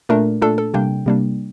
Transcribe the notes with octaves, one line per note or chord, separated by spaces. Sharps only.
A#2 A3 D4 A#4
A#2 A3 D4 A4
A4
C3 G3 A#3 D4 G5
C3 G3 A#3 D4